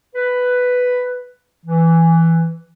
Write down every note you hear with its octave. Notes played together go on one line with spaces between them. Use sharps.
B4
E3